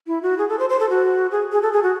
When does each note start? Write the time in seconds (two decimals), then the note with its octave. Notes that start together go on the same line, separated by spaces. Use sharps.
0.07 E4
0.22 F#4
0.38 G#4
0.49 A4
0.59 C5
0.69 C5
0.79 A4
0.90 F#4
1.31 G#4
1.52 G#4
1.62 A4
1.73 G#4
1.83 F#4